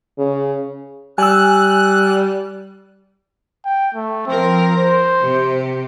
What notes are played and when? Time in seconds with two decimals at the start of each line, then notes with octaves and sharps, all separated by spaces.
0.18 C#3
1.18 G3 G#5 E6 F#6
3.65 G5
3.95 A3
4.27 F3 C4 A#4
4.75 C5
5.21 C3 G4